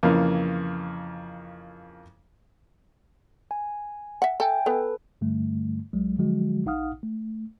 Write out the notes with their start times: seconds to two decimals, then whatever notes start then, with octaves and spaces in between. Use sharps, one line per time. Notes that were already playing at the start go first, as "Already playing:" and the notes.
0.03 F2 C#3 E3 A#3
3.51 G#5
4.22 E5 F#5
4.40 A4 E5 G5 G#5
4.66 B3 A4 B4
5.21 G2 D3 G3 A3
5.93 B1 F#3 G#3
6.18 D3 F3 F#3 G#3 F#4
6.66 A#1 D#4 F5 F#5 D#6 F6
7.03 A3